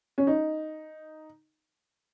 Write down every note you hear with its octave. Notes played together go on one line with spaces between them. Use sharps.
C#4
D#4